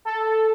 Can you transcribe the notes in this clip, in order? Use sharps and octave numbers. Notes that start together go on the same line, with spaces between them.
A4